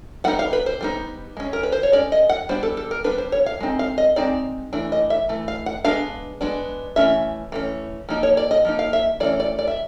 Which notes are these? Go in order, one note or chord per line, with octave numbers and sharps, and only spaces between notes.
G3 B3 D#4 F#5
F5
B4
C5
G3 B3 D#4
G#3 C#4
A#4
B4
C5
C#5
G#3 C#4 D5
D#5
F#5
G3 B3 D4 C5
A4
A4
A#4
G3 B3 D4 B4
C5
C#5
F5
G#3 C4 D#4
F5
D#5
G#3 C4 D#4 D5
E3 A3 D4
D#5
E5
E3 A3
F5
F#5
G#3 B3 D4 F5
G#3 B3 D4
E3 A3 C#4 E5
E3 A3 C#4
F3 A#3 D#4
C#5
D5
D#5
F3 A#3 D#4
F5
E5
E3 A3 C#4 D5
D5
D5
E5